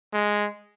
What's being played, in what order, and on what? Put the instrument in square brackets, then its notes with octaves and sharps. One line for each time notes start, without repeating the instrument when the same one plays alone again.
[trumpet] G#3